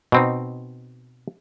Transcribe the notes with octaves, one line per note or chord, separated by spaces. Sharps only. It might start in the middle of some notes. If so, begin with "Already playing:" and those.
B2 C4 D#4